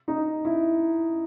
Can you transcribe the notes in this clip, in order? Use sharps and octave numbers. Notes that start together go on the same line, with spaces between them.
D#4
E4